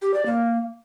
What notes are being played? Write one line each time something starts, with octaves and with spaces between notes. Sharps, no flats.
G4
D5
A#3